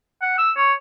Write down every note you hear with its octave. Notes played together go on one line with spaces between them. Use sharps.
F#5
E6
C#5